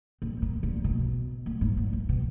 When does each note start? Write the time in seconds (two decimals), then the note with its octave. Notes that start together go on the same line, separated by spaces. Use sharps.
0.22 A#2
0.42 A#2
0.63 A#2
0.84 B2
1.46 A#2
1.61 G#2
1.77 A#2
1.93 A#2
2.09 B2